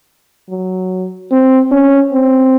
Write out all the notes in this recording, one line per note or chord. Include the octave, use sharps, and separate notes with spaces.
F#3
C4
C#4
C4